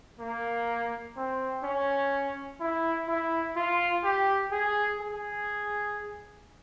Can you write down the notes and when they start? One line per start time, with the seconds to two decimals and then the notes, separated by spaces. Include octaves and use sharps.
0.20 A#3
1.17 C4
1.64 C#4
2.60 E4
3.08 E4
3.56 F4
4.04 G4
4.51 G#4
5.00 G#4